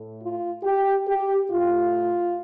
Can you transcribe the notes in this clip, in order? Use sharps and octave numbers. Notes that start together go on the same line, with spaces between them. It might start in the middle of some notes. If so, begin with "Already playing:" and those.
Already playing: A2 A3
F4
G4
G4
A2 A3 F4